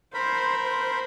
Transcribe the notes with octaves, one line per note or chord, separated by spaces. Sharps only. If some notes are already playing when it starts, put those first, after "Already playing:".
A#4 C5 B5
C5